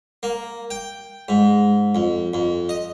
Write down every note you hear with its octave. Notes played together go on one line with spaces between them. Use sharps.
A#3
G5
G#2
F2
F2
D#5